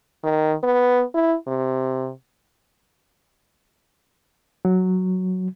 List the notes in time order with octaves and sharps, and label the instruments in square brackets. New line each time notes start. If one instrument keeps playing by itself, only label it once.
[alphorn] D#3
B3
E4
C3
[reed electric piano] F#3